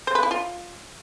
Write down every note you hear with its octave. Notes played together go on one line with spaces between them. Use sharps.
C5
B4
E4
F4